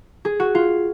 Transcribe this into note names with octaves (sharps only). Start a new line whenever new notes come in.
G#4
F#4
F4